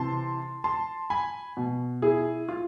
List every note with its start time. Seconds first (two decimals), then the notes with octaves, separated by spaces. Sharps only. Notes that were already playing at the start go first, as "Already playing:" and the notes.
Already playing: C3 E3 A5 C6
0.64 A5 C6
1.10 G#5 B5
1.57 B2
2.02 E4 G#4
2.49 F4